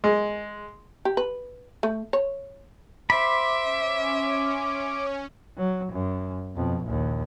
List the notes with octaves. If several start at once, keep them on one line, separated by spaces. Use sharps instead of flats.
G#3
G4
B4
A3
C#5
C5 E5 B5 D6
C#4
F#3
F#2
F2 B2
A#1 D#2